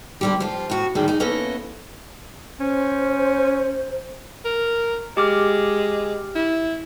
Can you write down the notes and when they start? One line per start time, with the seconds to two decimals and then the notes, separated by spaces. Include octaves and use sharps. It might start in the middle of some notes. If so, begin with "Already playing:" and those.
0.21 D3 G3 G4
0.40 F3 F4
0.70 A2 F#4
0.95 D#2 A2 D#3 G3 A#3 G#4
1.08 D#4 G#4
1.20 A#3 B3 C#4 E4 A4 D#5
2.60 C#4 C5
4.44 A#4
5.17 G#3 G4 D6 F6
6.35 E4